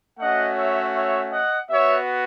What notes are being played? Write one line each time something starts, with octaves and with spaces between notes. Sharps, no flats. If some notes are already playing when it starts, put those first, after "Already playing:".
A3 C#4 F#4 D#5 F#5
C#5 E5
C#5 E5
D#5 F#5
B3 F#4 C#5 E5